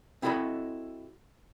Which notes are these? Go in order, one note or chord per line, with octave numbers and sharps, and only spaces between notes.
C4 E4 F#4 A4 D#5 B5